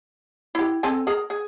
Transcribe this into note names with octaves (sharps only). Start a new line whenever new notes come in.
E4 G4
C4 A4 G#5
G#4 A#4
G#4